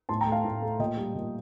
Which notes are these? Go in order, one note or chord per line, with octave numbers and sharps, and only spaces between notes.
A2 A5 C6
G5 A#5
A3
F5 A5
A2
A3
A#2 D#5 G5
G3
A#2